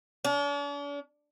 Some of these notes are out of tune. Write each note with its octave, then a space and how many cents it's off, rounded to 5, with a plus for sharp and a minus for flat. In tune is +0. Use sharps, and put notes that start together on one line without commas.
D4 -45